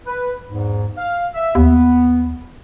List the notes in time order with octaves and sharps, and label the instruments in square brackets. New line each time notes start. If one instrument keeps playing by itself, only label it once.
[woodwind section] B4
E2 G#2
F5
E5
[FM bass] D#2 [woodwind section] B3